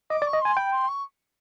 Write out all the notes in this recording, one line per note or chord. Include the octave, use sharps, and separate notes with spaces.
D#5 D6
D5
C#6
D#5
G#5 C6
G5 B5
C6
C#6